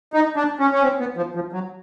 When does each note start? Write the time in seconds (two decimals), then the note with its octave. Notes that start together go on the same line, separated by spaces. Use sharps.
0.13 D#4
0.36 D4
0.60 C#4
0.72 C#4
0.83 C4
1.00 B3
1.17 F3
1.35 F3
1.53 F#3